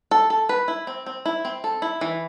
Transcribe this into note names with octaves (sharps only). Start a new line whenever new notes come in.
A4
A4
B4
E4
C4
C4
E4
C4
A4
E4
E3